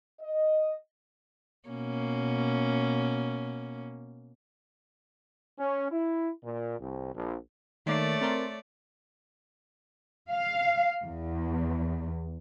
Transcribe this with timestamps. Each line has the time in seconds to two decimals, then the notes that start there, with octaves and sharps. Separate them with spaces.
0.21 D#5
1.69 B2 A#3 C#4
5.58 C#4
5.91 E4
6.43 A#2
6.79 C2
7.13 A#1
7.86 D#3 A3 A#3 C#5 D5
8.21 C4 A#4 C6
10.30 F5
11.03 E2